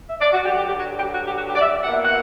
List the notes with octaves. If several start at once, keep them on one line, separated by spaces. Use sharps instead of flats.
E5
D5
F#4
G2 D3 F#3 G4
G4
G4
F#4
G4
F#4
G4
F#4
G4
D5
E5
B2 A#3 E4 F#5
E5
F#5